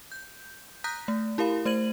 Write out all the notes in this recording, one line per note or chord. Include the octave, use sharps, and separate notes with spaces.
G6
A#5 D#6 F#6 G6 A#6 B6
A3
E4 G4 A#4 F5 B5
A3 C5 G#6 D#7 F#7